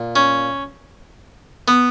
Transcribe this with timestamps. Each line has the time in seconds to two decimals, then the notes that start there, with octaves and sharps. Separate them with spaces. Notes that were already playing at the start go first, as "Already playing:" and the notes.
Already playing: A#2
0.16 C#4
1.68 B3